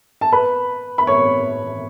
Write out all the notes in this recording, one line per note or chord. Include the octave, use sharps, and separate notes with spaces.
A5
B4 B5
B5
C#5 C#6